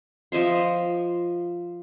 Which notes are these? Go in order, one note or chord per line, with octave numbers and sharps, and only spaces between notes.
F3 D#5 E5 C6